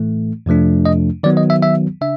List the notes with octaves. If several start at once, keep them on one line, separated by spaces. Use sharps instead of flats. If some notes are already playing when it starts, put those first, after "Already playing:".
Already playing: A2 E3 A3
F2 C3 F3 A3 D4
D#5
D#3 F#3 B3 D5
D#5
E5
E5
C#3 D4 E5